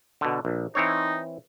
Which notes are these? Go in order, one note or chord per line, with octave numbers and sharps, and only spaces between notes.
B2 D3
A#1
E3 C4 D#4 C#5